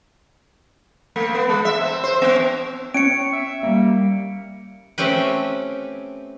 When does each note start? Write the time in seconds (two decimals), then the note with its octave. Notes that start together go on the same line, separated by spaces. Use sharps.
1.16 A3
1.35 B3
1.49 G#3
1.65 E5
1.81 C4
2.04 C5
2.22 B3
2.94 C#4 C#5 C#7 D7
3.33 E5
3.63 G3 A#3
4.98 A3 C4 C#4 G4 B4